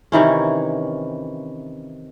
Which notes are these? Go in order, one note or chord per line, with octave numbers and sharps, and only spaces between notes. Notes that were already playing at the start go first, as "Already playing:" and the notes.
C3 D#3 E3 C#4